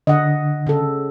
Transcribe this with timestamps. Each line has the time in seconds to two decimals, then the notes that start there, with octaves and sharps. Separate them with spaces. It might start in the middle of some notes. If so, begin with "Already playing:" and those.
0.07 D3 D#5 F#5
0.67 C#3 A4